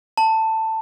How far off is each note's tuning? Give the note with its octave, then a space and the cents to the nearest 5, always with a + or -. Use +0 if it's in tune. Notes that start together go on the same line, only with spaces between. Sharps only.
A5 +15